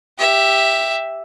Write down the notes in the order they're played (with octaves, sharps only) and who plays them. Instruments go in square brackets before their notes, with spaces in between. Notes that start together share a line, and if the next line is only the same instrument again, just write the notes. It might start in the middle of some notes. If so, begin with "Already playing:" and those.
[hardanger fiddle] G4 E5